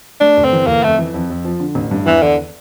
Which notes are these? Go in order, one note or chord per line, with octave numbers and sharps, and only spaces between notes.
A3 D4
G1
C4
E3
G1 A#3
F2 A3
E3
F2
F2
F3
D3
A1
G2
E2 E3
E2 D3